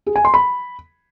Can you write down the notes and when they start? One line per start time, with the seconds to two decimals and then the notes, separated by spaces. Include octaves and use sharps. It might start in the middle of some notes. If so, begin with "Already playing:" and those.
0.06 G#4
0.16 G#5
0.25 C6
0.34 B5